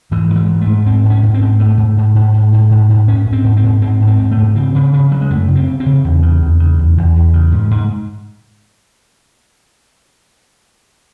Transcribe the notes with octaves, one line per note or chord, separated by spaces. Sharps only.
G#2 E3
G#2
E3
G#2
A3
G#2
G#2 C4
G#2
C#4
G#2
C4
G#2
G#2 A3
G#2
G#2
G#2
G#2
G#2
G#2
G#2
G#2 C#4
G#2
C4
G#2
C4
G#2
G#2 C4
G#2
C4
G#2
A3
G#2
C#3 C4
C#3
C#3
C#3 F#3
G#3
F#2 A3
C#3
C4
C#3
C4
C#3
E2
C#3
E2
C#3
E2
E2
E2
C#3
G#2
G#2